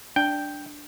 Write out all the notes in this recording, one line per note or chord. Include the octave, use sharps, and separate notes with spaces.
D4 G5